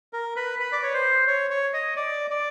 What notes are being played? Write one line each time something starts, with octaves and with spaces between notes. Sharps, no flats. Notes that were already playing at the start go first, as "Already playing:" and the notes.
A#4
B4
B4
D5
C#5
C5
C#5
C#5
D#5
D5
D5